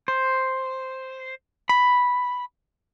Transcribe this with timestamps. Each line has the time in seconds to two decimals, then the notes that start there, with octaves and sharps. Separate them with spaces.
0.08 C5
1.69 B5